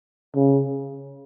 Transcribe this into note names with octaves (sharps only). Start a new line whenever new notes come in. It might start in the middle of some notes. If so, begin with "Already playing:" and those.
C#3